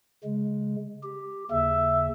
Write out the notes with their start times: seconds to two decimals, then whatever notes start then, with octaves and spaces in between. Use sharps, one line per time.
0.24 C#3 G#3
1.03 G4
1.51 D#2 C#3 E5